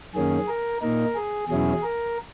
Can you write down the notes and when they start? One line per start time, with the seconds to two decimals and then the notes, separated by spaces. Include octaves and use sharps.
0.15 F#2 D#3 A#3 C#4 G#4
0.48 A#4
0.82 A#2 A#3 D#4 A#4
1.15 G#4
1.49 E2 B2 F#3 C#4 E4 G#4
1.82 A#4